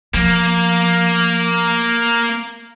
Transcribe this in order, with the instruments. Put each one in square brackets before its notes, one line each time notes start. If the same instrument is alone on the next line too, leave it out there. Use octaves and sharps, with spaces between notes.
[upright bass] F3 [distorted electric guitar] A#3